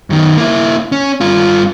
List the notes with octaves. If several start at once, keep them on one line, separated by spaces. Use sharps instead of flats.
F#2 D#3
A#3 E4
C#4
G2 F4